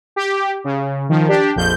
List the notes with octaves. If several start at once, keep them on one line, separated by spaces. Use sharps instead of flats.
G4
C#3
D#3 F3
D4 G4
A#1 F2 G6